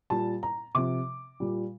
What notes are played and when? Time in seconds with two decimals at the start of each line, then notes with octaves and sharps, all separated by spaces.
0.10 A#2 G3 A5
0.43 A#5
0.75 C3 F3 D6
1.40 A#2 G3